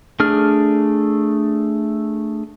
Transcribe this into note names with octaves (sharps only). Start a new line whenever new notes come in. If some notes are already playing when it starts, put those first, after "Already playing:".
A3 D4 G#4 F6